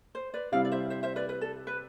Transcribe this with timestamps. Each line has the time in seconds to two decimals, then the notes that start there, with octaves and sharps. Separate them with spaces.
0.15 C5
0.34 B4 D5
0.52 C3 G3 C4 E4 D5 F5
0.65 D5
0.72 C5 E5
0.90 C5 E5
1.03 C5 E5
1.16 B4 D5
1.29 B4
1.41 A4
1.67 B4